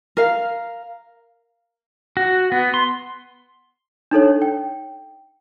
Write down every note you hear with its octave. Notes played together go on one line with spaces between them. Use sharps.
A#4 F5
F#4
B3
C6
D4 D#4 A4 C#5
G5